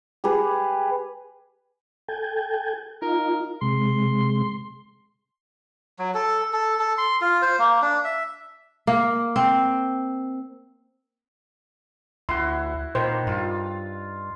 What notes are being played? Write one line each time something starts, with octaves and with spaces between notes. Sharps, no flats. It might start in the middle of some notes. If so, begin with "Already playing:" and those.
G4 G#4 B4
A4 G5 G#5
D#4 F4 A#4
C3 G#3 C6
F#3
A4
A4
A4
C6
F4
C5
A#3
D4
E5
A#3
C4
D2 E4 F#4 C6
A#2 D#3 C5
G2 F4